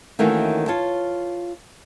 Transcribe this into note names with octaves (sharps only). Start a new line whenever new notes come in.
D#3 E3 A3 A#3 C#4 F#4
F4 C#5 A5